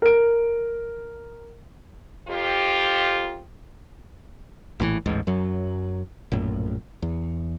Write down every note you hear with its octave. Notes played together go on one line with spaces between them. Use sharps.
A#4 D7
F2 F4 G4
A#1 A2 C#3 E3
A1 D2 G#2
F#2 F#3
A#1 F#2 A2
E2